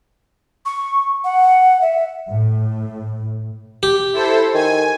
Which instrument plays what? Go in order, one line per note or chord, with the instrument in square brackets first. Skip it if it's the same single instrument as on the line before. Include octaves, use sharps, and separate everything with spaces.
[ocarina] C#6
F#5
E5
[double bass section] A2
[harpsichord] G4
[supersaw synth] E4 A4 C5
[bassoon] D#3 [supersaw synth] G#5